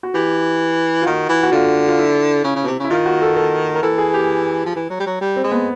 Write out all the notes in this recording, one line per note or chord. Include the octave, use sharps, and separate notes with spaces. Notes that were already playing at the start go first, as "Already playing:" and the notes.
F#4
E3 G4
F4
D#3 F#4
E3
F#4
D3 F4
F4
E4
C#3
C#3
B2
C3
C#3 E4
D#3 F4
F#4
A4
A4
A#4
E3 A4
G#4
G4
F3
E3
F#3
G3
F#3
G3
C4
G#3
B3